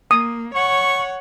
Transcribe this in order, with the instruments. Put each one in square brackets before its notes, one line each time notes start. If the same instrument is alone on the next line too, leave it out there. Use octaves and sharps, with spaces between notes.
[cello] A#3 [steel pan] D#6
[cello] C#5 F#5 [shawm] C#6